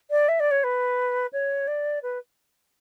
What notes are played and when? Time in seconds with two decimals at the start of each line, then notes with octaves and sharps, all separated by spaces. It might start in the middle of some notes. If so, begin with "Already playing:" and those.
0.10 D5
0.28 E5
0.39 D5
0.51 C#5
0.63 B4
1.32 C#5
1.67 D5
2.02 B4